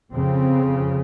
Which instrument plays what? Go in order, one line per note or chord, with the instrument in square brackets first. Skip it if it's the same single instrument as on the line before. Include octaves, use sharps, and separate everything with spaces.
[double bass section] F2 C#3 C4